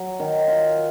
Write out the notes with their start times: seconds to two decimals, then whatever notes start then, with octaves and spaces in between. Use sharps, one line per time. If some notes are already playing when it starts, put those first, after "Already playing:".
Already playing: F#3
0.20 D#3
0.48 F4